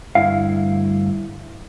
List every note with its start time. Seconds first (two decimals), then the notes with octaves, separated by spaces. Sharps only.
0.15 D2 G2 E4 F5